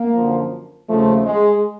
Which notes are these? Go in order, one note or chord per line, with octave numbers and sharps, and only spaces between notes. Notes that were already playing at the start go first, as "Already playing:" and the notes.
Already playing: A#3
F#2 D3 F3
D#2 C#3 F3 A3
G#3